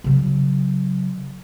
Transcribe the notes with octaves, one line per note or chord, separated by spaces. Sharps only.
C#3 F#3